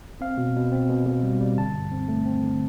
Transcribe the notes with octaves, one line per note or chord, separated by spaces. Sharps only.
C4 F5
B2
B2
C4
B2
B2
G3
G3
D3 A5
G2
C4
A3
C4
D3